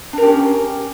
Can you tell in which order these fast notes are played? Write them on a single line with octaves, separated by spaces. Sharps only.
D4 A#4 G4 C#4